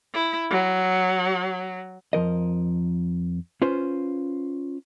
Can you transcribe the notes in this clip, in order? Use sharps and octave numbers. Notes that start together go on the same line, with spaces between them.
E4
F#3
F2 F3 A#4 D#5
C#4 F4 B4 C5